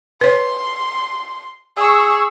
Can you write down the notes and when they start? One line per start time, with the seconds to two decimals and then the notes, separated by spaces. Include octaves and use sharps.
0.21 B4 C#5 C6
1.77 G#4 C#6 E6